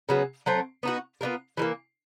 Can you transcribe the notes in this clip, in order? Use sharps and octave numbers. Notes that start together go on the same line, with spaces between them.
C#3 F#3 B3
F#3 A3 C4
B3 D#4 F#4
B3 D4 F4 A#4
E3 G3 A#3